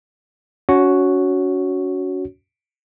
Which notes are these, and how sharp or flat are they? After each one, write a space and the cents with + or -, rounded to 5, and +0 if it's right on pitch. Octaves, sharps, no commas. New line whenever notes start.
C#4 +35 F#4 +0 C#5 +5